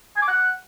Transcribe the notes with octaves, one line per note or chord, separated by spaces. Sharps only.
G#5
D6
F#5